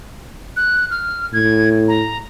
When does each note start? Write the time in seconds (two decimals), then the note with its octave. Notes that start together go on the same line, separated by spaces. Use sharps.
0.56 F#6
0.91 F6
1.33 A2 G#6
1.88 A#5